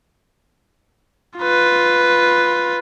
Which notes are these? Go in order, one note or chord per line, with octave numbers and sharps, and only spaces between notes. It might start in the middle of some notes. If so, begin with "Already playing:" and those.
F4 B4